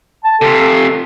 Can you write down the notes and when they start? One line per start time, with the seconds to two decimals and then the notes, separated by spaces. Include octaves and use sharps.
0.24 A5
0.42 C3 F4 A4